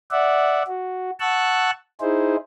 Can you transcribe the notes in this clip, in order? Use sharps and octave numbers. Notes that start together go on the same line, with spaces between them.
D5 E5 F#5
F#4
F#5 A5 C#6 E6 F#6
D#4 E4 G#4 C5